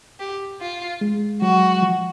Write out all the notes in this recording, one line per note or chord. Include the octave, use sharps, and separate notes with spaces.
G4
F4
G#3
F#3 F#4
F3